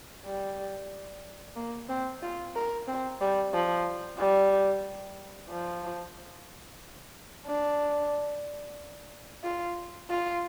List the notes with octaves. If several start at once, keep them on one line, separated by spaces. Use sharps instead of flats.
G3
A#3
C4
F4
A#4
C4
G3
F3
G3
F3
D4
F4
F4